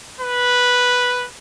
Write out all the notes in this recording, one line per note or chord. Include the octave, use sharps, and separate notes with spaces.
B4